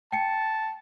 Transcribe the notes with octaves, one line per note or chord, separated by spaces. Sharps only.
G5 A5 C#7